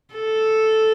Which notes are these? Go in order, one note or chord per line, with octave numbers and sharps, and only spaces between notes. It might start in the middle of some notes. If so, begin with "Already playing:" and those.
A4